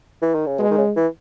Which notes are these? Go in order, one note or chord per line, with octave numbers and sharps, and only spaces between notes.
E3
D#3
C#3
B2 G#3
D#3
C#3
E3